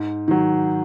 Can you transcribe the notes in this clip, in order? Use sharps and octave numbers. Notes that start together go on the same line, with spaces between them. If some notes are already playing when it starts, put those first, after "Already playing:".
Already playing: G#2
D#3 F#3